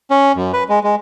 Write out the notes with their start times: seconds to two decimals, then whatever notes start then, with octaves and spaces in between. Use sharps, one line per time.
0.11 C#4
0.36 F#2
0.53 B4
0.69 G#3
0.84 G#3